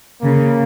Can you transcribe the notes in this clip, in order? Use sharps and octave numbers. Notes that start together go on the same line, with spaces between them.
C#3 A#3